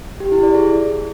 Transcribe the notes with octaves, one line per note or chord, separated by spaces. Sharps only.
G4
E4
D5
G#4